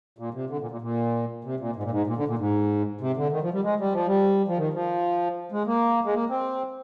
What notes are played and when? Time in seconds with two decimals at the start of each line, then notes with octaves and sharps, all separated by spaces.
0.19 A#2
0.34 C3
0.50 D3
0.61 A#2
0.71 A#2
0.81 A#2
1.44 C3
1.60 A#2
1.76 G#2
1.83 A#2
1.91 G#2
2.07 A#2
2.17 D3
2.28 A#2
2.39 G#2
3.01 C3
3.17 D3
3.32 D#3
3.42 F3
3.53 G3
3.64 G#3
3.80 G3
3.93 F3
4.07 G3
4.48 F3
4.58 D#3
4.74 F3
5.52 G#3
5.67 A#3
6.05 G#3
6.14 A#3
6.30 C4